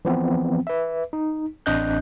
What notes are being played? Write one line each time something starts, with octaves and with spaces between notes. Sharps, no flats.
E3 F3 B3 C4
B4 E5
D#4
A1 C4 D4 D#5 F#6 G6